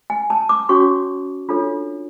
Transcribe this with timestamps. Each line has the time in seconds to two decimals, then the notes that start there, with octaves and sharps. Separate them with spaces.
0.10 G#5
0.30 A5
0.49 D6
0.69 C#4 F#4 C#5 C#6
1.49 D4 F4 A4 C#5